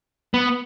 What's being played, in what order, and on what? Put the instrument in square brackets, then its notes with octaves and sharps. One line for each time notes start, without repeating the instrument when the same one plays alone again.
[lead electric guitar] B3